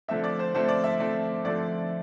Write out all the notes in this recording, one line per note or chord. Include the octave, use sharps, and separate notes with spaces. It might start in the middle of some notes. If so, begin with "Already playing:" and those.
D3 F3 A3 C4 E5
D5
C5
D3 F3 A3 C4 C5
D5
E5
D3 F3 A3 C4
D3 F3 A3 C4 D5